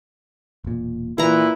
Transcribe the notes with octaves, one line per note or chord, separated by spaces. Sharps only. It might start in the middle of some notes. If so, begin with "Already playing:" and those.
E1 A#2
A#2 E3 E4 B4 A#5